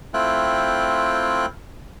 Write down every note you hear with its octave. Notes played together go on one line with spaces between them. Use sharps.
A3 C4 E4 F4 G5 F#6